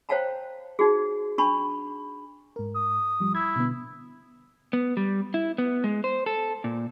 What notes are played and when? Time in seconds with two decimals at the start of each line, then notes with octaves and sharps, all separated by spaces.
0.09 C5 C#5 F5 G5 A5 A#5
0.79 D#4 F#4 G#4
1.38 D4 A5 B5 C#6
2.56 G#2 A#4
2.75 D#6
3.20 F3 G3
3.35 E4 G#6
3.56 B2 D3 B3
4.73 B3
4.97 G3
5.34 E4
5.58 B3
5.84 G#3
6.04 C5
6.26 A4
6.64 A#2